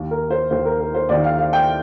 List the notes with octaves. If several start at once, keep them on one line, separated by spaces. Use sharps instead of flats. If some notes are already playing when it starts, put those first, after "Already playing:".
Already playing: D#2 D#3
A#4
C5
D#2 D#3 C5
A#4
A#4
C5
D#2 D#3 D5
F5
F5
G5